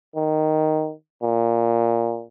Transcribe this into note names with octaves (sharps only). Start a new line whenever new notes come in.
D#3
A#2